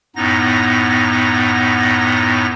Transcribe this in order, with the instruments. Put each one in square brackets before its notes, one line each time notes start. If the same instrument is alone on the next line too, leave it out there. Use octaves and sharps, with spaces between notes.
[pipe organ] F#2 A2 B3 D#4 A#6